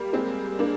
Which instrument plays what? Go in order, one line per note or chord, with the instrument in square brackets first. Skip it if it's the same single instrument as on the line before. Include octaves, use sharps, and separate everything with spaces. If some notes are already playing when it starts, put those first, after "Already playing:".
Already playing: [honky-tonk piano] G3 A#3
G#3 C4
A#3 D4